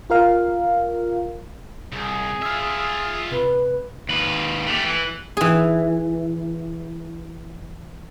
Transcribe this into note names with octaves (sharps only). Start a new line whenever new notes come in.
F4 A#4 F5
C2 G#4
F4 E5 E6 F6
C3 B4
D#2 B4
A3 G4
E3
E3 G#4